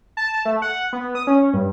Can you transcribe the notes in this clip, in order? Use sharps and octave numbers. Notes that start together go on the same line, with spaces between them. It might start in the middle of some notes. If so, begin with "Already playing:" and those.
A5
A3
F#5
B3
D#6
C#4
G2